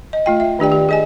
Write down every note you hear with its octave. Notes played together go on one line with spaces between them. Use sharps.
D#5
A3 F4 G5
E5
D#3 D4 G4 D5 G5
G4
G#4 D#5 G#5